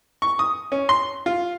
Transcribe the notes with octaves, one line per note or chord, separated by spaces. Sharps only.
C#6
D#6
C#4
C6
F4